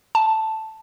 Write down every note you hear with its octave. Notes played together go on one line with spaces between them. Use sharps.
A5